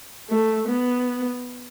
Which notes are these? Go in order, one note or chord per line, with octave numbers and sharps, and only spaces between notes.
A3
B3